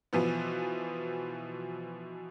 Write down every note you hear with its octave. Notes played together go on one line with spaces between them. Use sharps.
B2 E3 F3 B3